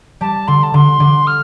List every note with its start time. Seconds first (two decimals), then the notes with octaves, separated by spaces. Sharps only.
0.21 G3 A5
0.48 D3 C6
0.63 A5
0.74 D3 C6
1.00 D3
1.27 F6